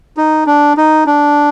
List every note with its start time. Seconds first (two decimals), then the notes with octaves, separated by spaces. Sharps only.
0.17 D#4
0.46 D4
0.77 D#4
1.07 D4